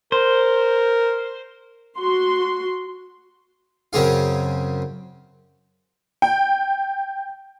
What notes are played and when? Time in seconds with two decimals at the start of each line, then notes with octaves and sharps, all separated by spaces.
0.12 A#4 C5
1.97 F#4 C6
3.93 F#2 C#3 C4 G#4 F5
6.22 G5